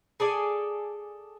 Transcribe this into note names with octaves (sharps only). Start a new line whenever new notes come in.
G#4 A4 D5 G#5